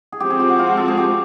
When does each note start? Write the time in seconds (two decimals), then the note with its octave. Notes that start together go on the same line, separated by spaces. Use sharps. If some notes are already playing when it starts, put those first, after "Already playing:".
0.12 G#4
0.20 F3 G#3 C4 G4
0.30 G#4
0.40 G4
0.50 F#4
0.59 F4
0.68 F#4
0.77 A4
0.88 G#4
0.97 G4